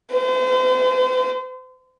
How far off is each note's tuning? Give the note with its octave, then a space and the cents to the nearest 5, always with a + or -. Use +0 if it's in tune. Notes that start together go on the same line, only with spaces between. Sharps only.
C5 -40